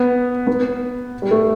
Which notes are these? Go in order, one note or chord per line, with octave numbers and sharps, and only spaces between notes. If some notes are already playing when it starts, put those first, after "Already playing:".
Already playing: B3
B3
G3
A3